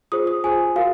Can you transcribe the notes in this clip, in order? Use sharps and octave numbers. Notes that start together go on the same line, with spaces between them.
F4 G#4 C5 D#6
D#6
F4 G#4 C5 G#5
F#4 A#4 F5